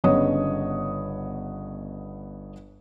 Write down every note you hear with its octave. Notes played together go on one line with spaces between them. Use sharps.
G1 C#3 B3 C#5 D#5 D#6